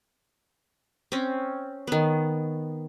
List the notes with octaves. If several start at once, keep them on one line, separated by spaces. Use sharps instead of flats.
C4 C#4
D#3 B3